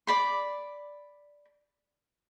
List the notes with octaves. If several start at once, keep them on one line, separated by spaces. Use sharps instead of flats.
D5 B5 C6